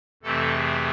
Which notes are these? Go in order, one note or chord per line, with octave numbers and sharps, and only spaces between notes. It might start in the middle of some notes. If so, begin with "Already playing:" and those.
F2 C3 E3 A3 C4 A4
G#4